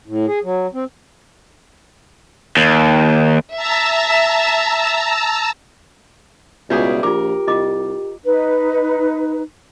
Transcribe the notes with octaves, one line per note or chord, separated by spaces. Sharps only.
A2
G#4
F#3
C4
D#2
E5 A5 A#5 E6
C#2 B2 G3 E4 F4 G#4
A#1 F4 G4 A#4 D6
C2 F4 D#5 D6
D#4 B4